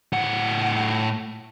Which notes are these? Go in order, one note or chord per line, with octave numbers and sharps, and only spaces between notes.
A2 F#5